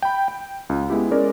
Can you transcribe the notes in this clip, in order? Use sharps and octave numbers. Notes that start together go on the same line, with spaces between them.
G5 B5
G5
C#2
G#3 B3 E4 G4
G#3 C#4 A#4 D5